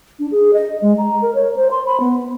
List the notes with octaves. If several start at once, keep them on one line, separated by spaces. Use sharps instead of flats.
D4
G#4
D#5
G#3
A#5
A#4
C#5
C5
C6
B5
B3